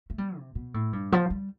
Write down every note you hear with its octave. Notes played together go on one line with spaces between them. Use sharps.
A3
G3
C3
B2
A2
G2
F3
G3